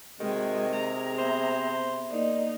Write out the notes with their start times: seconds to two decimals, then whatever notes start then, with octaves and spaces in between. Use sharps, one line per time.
0.20 C3 D#3 G#3 F#4 G5
0.74 G#4 A#5
1.18 B3 C5 E5
2.10 A#3 D#4 D5 D#5